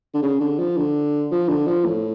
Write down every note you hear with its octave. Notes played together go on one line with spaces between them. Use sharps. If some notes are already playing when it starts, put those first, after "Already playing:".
D3
C#3
D3
F3
D3
F3
D3
F3
A2